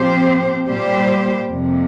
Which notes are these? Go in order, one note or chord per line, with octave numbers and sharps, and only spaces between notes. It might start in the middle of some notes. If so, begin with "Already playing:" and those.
Already playing: A#2 F3 C4 G4 C5
A#2 G3 A#3 G4 C5
F2 C3 A#3